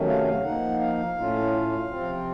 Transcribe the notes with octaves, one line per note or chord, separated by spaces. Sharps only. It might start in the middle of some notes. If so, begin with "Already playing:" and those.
Already playing: C3 D#3 F#3 A3 C#4
F5
F5
F3 A#3 D#4 F#5
F5
A2 A3 C#4 F4
C3 F3 C4 F4